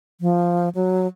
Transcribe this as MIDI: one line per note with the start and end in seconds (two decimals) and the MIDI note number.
0.21 0.69 53
0.75 1.07 54